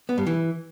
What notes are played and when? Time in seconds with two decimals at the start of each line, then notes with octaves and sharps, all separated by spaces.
0.09 B3
0.18 G2
0.27 E3